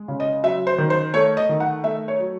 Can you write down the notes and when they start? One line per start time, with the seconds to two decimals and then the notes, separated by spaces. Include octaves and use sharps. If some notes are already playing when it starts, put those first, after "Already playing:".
Already playing: G#3
0.08 C#3
0.20 D#5
0.43 F#3 E5
0.67 C5
0.78 D#3
0.90 C5
1.14 A3 C#5
1.37 D#5
1.49 D#3
1.60 F#5
1.84 A3 E5
2.08 C#5
2.20 F#3